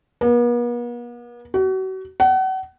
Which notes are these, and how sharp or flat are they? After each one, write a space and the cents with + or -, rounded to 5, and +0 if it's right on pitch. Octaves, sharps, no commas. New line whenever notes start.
B3 -45
F#4 +35
F#5 +35